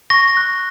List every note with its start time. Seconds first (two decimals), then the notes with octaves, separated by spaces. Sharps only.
0.10 C#6 A#6
0.37 F#6